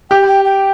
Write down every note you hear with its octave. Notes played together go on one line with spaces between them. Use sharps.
G4 G5
G5
G5